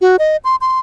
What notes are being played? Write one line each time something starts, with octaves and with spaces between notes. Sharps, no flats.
F#4
D#5
C6
C6